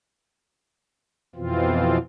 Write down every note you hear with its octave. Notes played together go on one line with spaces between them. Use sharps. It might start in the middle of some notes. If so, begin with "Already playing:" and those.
F2 B2 E3 C4 F4